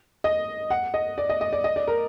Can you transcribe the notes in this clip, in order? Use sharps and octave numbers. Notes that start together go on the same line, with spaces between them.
D#5
F#5
D#5
D5
D#5
D#5
D5
D#5
D5
A#4